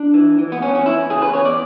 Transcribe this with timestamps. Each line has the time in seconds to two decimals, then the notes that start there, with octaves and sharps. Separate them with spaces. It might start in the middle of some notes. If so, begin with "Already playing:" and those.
Already playing: D4
0.14 E3
0.39 E3
0.52 B3
0.62 E2 C#4
0.75 C#4
0.86 E3 E4
1.10 C#3 G#4
1.22 B4
1.34 E2 C#5
1.45 D5